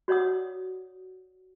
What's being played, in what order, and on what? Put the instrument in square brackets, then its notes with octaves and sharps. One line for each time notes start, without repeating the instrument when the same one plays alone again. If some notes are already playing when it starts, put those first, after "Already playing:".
[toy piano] F#4 C#5 D5 F#5 D#6